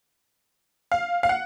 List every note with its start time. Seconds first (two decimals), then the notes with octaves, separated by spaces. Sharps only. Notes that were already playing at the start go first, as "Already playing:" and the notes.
0.92 F5
1.23 F5
1.29 F#5